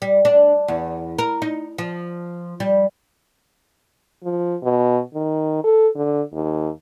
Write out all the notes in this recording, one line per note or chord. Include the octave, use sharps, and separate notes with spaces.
G3
D4
E2
A#4
D#4
F3
G3
F3
B2
D#3
A4
D3
D#2